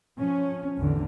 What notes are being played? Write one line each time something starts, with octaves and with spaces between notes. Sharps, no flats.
F3 C#4
A1 E2 D3